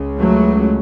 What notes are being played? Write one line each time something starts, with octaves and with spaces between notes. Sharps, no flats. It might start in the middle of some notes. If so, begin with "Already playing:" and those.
Already playing: C#2 C#3
F#3 A3